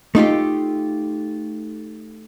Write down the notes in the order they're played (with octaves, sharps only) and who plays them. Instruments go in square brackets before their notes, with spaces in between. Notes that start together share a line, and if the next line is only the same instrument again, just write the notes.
[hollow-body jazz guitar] A3 D#4 F4 G4